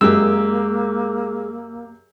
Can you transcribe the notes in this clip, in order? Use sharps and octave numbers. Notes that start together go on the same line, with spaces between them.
F#2 G#3 A#3 G4 E6